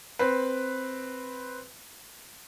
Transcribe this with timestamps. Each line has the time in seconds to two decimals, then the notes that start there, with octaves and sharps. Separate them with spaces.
0.19 C4 B4